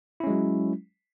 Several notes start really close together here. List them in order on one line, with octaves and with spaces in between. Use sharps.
E4 C#4 G#3 F#3